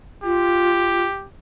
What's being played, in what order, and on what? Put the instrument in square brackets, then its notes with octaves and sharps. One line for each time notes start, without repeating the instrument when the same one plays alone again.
[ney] F4 [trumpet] G4